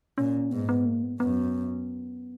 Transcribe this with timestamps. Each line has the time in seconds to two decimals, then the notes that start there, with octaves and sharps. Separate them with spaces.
0.18 A#2 C#4
0.51 G#2 B3
0.69 B3
0.86 A#3
1.03 B3
1.20 F#2 B3